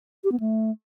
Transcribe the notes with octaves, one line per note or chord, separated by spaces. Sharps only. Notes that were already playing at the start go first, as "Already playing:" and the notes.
G4
B3
A3